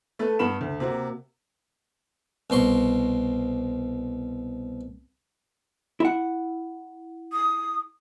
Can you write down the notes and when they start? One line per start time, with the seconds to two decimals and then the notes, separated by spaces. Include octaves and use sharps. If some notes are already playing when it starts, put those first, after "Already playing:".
0.19 A3 A4 B4
0.39 G2 B3 B5 E7
0.61 D2
0.80 C3 A#3 F#4
2.50 C2 B2 C6 C#6
6.00 E4 F#5
7.33 D#6